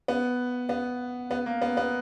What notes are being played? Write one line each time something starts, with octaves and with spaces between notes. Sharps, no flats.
B3
B3
B3
A#3
B3
B3